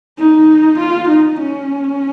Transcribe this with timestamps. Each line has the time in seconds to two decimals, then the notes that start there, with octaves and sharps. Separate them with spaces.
0.18 D#4
0.79 F4
1.08 D#4
1.40 C#4